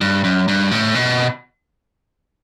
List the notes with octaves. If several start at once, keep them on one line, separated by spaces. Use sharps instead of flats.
G2
F#2
G2
A2
B2